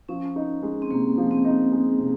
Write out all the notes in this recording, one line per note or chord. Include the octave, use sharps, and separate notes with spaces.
F3 C#4
D#4
G#3
C4
C3 A#3
F3
C4
D#4
G#3
C3